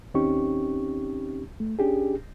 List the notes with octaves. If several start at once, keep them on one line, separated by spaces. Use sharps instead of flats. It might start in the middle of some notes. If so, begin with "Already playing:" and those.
D#2 C4 C#4 D#4 G4 C#6
A3
C#4 D4 G4 G#4